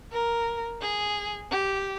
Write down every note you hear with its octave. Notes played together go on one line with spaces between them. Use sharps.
A#4
G#4
G4